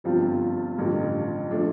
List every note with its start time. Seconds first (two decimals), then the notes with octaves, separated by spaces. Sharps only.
0.04 G1 G2 F3 C4 F4
0.78 A1 G2 D3 F3
1.51 F3 A3 D4